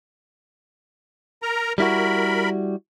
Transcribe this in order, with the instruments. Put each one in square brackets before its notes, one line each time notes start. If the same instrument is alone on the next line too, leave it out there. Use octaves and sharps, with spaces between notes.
[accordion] A#4 A#5
[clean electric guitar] G3 E4 F#4 [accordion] A#4 B5